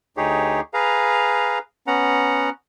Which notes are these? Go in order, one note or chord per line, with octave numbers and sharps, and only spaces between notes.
D2 D#4 G4 G#4 C#5
G#4 B4 F5 A#5
B3 C#4 F#5 A#5